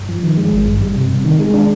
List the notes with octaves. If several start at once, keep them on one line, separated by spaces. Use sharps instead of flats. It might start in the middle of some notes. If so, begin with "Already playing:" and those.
Already playing: G2
F3
D#3
G#3
G#1
G2
G3
C3
C3
D#3
G#3
D4